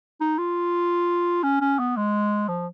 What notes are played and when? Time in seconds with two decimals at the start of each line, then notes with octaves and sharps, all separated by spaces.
0.21 D#4
0.38 F4
1.43 C#4
1.61 C#4
1.79 B3
1.97 G#3
2.48 F3